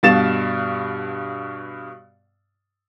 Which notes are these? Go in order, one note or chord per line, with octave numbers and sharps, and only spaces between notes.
G2 B2 F5 A6 E7